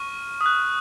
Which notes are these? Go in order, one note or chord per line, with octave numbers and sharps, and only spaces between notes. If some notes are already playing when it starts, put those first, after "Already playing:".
Already playing: C#6 F6 D#7
D#6
F#6